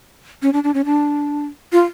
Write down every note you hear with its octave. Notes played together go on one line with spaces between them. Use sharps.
C#4
D4
D4
C#4
D4
F4